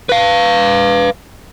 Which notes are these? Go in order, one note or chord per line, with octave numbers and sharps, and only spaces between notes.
B4 F5